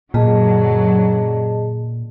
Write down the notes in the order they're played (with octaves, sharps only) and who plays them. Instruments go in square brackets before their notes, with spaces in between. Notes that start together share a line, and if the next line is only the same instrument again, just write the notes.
[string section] F#2 D3 F#3 [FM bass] A#2 [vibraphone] G#4 D#5 A5